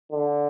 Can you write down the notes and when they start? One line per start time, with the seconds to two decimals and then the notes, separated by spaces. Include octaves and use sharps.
0.12 D3